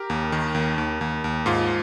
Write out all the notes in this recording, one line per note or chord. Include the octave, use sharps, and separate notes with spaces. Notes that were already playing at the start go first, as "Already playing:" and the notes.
Already playing: G4 A#4
D#2
D#3
D#2
D#2
D#2
D#2
G#2 F4